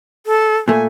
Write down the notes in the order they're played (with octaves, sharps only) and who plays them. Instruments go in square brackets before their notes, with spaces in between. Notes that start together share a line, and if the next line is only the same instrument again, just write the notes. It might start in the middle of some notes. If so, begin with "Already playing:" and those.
[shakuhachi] A4
[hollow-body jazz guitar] A#2 A3 [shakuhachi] G#5